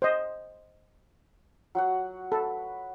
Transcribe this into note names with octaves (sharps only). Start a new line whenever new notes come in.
C5 D#5
F#3 F#4 F#5
A4 B4